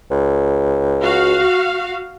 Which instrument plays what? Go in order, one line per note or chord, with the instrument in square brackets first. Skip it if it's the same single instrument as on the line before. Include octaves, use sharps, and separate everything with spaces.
[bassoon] C#2
[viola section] F#4 F5